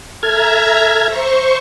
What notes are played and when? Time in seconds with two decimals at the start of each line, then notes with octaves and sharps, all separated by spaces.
0.23 A4 E5 A#5 F6 G#6
1.07 C5 C#6